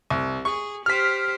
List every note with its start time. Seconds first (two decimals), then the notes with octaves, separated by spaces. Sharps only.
0.10 C2
0.45 G#4 C#6
0.86 G4 C5 F6 B6